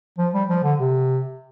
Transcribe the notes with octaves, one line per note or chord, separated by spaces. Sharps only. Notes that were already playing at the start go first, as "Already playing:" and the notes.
F3
G3
F3
D3
C3